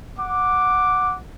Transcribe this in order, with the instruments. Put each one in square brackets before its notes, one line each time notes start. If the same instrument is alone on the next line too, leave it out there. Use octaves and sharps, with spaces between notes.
[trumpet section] F#5 D6